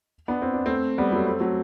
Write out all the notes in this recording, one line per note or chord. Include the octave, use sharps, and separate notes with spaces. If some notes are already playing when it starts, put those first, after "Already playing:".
B3 D4
C4
D4
A3 C4
G3 B3
F#3 A3
A3 C4
F#3 A3